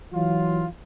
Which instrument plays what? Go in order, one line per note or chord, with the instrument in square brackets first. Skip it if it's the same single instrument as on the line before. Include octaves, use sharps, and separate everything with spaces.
[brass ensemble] E3 F#3 F4